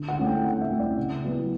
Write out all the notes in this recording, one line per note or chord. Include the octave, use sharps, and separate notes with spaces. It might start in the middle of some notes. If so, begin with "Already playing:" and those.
Already playing: D3
F#5
A3 C#4 E4
G5
D3 F#5
E5
A3 C#4 E4
D5
C#3
F#3 B3 E4